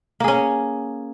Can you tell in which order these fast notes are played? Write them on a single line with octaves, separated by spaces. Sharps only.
A#3 G#4 C#4